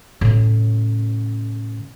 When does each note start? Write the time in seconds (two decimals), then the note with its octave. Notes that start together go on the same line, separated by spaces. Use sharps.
0.21 A2 C#3